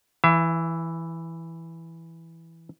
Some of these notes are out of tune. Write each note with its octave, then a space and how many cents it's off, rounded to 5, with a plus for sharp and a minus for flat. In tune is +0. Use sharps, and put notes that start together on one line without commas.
E3 +0 E5 +35